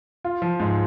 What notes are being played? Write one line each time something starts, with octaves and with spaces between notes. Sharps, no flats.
F4
F3
G#2